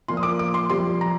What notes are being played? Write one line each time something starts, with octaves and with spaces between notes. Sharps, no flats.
A#2 F3 A#3 C6
D#6
D6
D6
C6
F2 C3 G3 C6
A#5